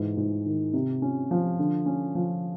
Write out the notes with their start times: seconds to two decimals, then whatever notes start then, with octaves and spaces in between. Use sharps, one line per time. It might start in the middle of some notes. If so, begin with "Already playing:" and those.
Already playing: G#2 E3
0.17 G#2
0.46 D#3
0.73 C3
1.02 C#4
1.31 F3
1.59 D3
1.86 C#4
2.15 F3